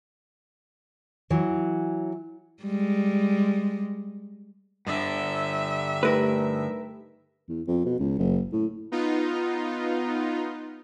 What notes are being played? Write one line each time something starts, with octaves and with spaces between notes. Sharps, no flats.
E3 F#3
G3 G#3
G2 D3 E5
A3 D#4 G4 A#4 B4
E2
F2
B2
C#2
F#1
A2
B3 D#4 F4